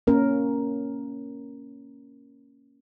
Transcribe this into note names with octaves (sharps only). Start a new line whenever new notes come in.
A#3 C#4 A#4